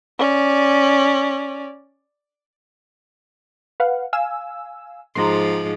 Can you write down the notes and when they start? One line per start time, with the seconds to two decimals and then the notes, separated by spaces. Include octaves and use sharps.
0.18 C#4 D5
3.80 B4 F5 F#5
4.13 F5 G#5 E6
5.15 G#2 F3 A#5 C6